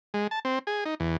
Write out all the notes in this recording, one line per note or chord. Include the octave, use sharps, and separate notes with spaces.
G#3
A5
C4
G#4
D#4
E2